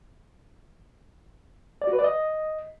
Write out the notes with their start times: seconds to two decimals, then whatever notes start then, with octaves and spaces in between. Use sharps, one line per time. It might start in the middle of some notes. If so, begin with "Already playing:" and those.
1.82 D5
1.87 F#4
1.93 B4
1.99 D5
2.04 D#5